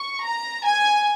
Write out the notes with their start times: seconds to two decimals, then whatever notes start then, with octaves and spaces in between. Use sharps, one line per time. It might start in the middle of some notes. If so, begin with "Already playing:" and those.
Already playing: C#6
0.24 A#5
0.65 G#5